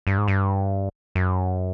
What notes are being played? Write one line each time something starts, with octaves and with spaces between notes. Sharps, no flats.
G2
G#2
G2
F#2